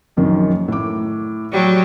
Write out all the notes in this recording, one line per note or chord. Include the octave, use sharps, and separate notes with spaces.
A#1 F#2 D#3
A2 D6
F#3 G3